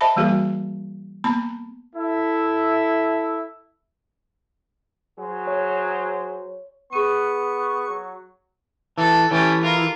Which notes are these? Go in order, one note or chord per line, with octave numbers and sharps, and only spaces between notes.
C5 D#5 E5 A5 B5
E3 G3 A#3 F#4 G#4 A#4
A#3 B3 A#5 B5
E4 A4 E5
F#3 G#4 C5
C#5
B3 G#4 C#6 D#7
F#3
E3 A4 A5
E3 A3 C#4 G4
E4 F4 A#4